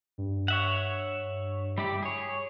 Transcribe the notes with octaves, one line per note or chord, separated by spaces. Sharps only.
G2
C#5 E5 F#5
G3 E4 G4
G#4 C#5